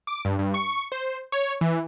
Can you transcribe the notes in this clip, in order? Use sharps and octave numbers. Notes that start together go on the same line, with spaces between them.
D6
G2
G2
C#6
C5
C#5
E3